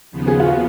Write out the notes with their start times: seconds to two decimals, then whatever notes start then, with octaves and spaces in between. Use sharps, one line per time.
0.11 D#2 C#3 F3 B3
0.28 G#4
0.40 F4
0.45 F#4